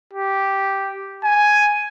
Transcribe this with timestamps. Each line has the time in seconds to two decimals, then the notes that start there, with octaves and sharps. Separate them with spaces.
0.14 G4
1.24 G#5